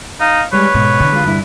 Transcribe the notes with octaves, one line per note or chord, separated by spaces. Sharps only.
D#4 F5
G3 G#3 B4 C#5
G#2 B2
E2 D3
G#3 F4
G2 E4